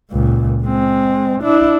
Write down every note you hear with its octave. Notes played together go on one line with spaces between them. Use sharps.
C#2 A#2
G#3 C4
D4 E4